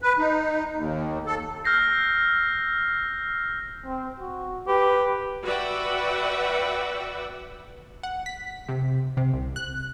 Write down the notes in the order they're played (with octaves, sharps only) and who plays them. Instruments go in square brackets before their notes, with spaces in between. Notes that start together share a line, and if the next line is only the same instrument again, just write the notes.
[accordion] B4
D#4
D#2
A4
[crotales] E6 F6 G6 A#6 C7
[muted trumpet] C4
F#4
[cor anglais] G4 [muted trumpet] B4
[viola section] F#4 B4 D5 E5 F#5 G5
[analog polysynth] F#5
B6
C3
C3
C2
F#6